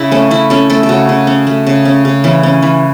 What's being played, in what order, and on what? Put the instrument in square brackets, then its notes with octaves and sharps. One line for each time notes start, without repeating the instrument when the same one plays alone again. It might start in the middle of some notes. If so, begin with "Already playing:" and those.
Already playing: [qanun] C#3 E4
A3 C#4
C#4 E4
C#4 A4
A3 A4
A4
C#3 F#4
C#3
C#4
A3
C#3
C#4
C#3
E3 C#4
C#4
E3